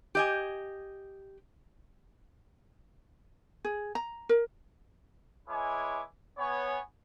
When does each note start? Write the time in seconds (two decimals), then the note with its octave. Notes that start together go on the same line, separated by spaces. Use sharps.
0.15 G4 D#5 G#5
3.65 G#4
3.95 A#5
4.29 A#4
5.48 G#3 E4 B4 C#5 G#5 D6
6.37 B3 C#5 G#5